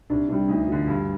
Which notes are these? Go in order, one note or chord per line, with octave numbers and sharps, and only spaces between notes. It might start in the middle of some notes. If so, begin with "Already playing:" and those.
C2 D4
C3 G3 D4
D2 D#4
D3 F3
G2